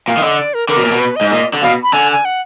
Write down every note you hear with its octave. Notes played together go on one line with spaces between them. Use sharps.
A#2 F5
D#3
D3 D#5
D5
A#4
D3 A#4
B2
A#2
B2
B4
D#5
G#2
A#2 D#5
D3
B2 F5
B5
D3 G#5
G#5
F#5